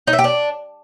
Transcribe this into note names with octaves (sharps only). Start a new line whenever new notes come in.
D#4
E5
G4
D4